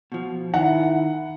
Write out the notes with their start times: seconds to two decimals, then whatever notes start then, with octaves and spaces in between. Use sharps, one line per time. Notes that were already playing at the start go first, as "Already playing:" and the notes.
0.12 B2 F3
0.54 D#3 E4 F#5